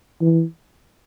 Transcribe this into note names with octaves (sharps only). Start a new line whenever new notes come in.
E3